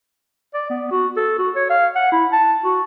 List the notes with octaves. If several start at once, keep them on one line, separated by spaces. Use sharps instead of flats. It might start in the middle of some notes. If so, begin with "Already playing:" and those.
D5
B3
F#4
A4
F#4
C#5
F5
F#5
E4
A5
F#4